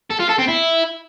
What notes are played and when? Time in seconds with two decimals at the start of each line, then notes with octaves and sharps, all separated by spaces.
0.11 A4
0.20 F4
0.30 A4
0.39 C4
0.49 E4